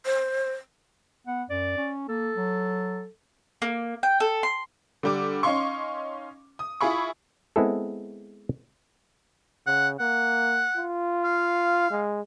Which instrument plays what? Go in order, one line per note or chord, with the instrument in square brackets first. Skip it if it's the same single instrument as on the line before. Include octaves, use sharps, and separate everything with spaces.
[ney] C5
[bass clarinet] B3 [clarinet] F#5
[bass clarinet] F#2 [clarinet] D5
[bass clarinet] C#4
[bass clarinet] A#3 [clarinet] A4
[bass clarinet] F#3
[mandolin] A#3
G5
A4
C6
[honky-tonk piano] D3 G3 D6
C#4 D#4 F5 C6 C#6
D#6
E4 F4 G#4 B5 C#6
[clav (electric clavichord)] G#3 B3 C4 E4 G#4 A4
[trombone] C#3 [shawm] F#5
[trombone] A#3 [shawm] F#5
[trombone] F4
[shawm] F5
[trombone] G#3